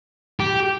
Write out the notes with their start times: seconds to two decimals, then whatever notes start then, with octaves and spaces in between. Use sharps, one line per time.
0.40 G4